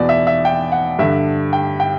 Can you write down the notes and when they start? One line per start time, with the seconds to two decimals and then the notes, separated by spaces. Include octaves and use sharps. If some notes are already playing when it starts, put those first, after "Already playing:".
Already playing: E2 B2 D5
0.09 E5
0.27 E5
0.45 G5
0.72 F#5
0.99 G2 D3 E5
1.53 G5
1.80 G5